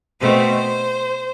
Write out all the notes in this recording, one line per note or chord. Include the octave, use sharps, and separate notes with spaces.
B2 A3 C4 C5